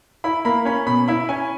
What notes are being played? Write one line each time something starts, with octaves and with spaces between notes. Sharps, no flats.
E4 B5
A#3 B5
C#4 B5
B2 B5
E4 B5
C#4 G#5